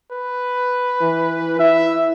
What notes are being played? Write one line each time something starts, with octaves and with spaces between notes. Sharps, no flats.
B4
E3
E4 E5